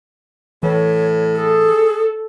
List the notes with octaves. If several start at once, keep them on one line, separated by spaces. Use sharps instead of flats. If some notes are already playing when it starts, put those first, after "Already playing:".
A2 E3 C#5
G#4 A4